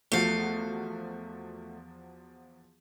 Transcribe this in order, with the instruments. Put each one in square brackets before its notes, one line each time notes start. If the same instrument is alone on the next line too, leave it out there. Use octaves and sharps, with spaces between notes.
[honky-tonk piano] E2 F3 F#4 [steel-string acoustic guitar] A3 F5